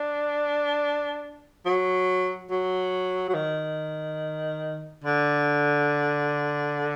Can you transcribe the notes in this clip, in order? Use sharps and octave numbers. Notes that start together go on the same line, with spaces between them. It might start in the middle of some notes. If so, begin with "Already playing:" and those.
Already playing: D4
F#3
F#3
F#3
D#3
D3